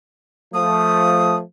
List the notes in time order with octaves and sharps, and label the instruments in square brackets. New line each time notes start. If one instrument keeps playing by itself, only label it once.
[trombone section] F3 A3 [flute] D#6